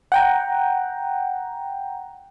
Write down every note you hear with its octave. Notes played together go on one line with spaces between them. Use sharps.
F#5 G5 A#5